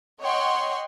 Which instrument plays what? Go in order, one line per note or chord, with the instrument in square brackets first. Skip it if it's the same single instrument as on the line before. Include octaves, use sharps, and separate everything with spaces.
[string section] C#5 D#5 F#5 G5 C6 C#6